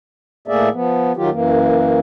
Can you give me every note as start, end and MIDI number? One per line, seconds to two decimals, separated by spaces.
0.48 0.69 45
0.48 0.69 57
0.48 0.69 58
0.48 0.69 68
0.48 0.69 74
0.48 0.69 76
0.73 1.12 53
0.73 1.12 59
1.17 1.30 51
1.17 1.30 54
1.17 1.30 65
1.17 1.30 67
1.31 2.00 42
1.31 2.00 52
1.31 2.00 58